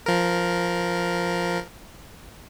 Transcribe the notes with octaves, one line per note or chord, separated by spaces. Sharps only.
F3 A#4